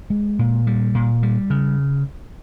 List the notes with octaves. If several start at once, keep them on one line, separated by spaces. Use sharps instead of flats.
G#3
A#2
G3
A#2
G3
C#3